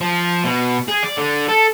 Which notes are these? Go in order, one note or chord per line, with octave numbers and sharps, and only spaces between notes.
F3
B2
G#4
D5
D3
A4